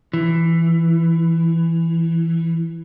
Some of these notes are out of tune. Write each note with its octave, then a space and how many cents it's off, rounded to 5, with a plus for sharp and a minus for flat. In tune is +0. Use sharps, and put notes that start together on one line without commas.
E3 +10